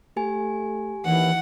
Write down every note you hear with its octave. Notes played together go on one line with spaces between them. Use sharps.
A3 G4 G#5
D#2 E3 F#5